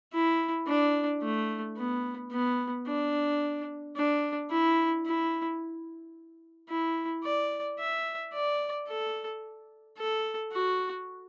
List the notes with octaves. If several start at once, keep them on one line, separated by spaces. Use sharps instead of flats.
E4
D4
A3
B3
B3
D4
D4
E4
E4
E4
D5
E5
D5
A4
A4
F#4